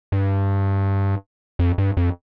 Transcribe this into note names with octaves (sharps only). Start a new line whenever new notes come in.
G2
F2
G2
F2